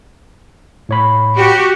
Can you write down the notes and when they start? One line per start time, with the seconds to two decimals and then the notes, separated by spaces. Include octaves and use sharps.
0.89 A2 C#5 B5
1.35 F#4 G4